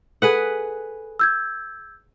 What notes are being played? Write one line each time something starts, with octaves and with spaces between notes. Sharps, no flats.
G#4 A4 B4 F#5 F#6
E6 G6 G#6